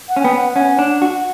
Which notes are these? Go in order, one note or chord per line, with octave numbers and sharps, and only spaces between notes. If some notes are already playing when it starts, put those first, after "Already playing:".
F#5
C#4
B3 G5
F#5
C#4 F#5
D4
F#4 F#5